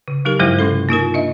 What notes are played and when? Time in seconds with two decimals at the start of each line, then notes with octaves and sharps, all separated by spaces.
0.08 C#3
0.25 F#3 D#4 G4 A#4
0.39 G2 F3 F#3 G#3 E4 C5
0.59 C3 G#3 C#4 A4
0.89 A#3 D#4 F4 A#4
1.14 D4 D#5 E5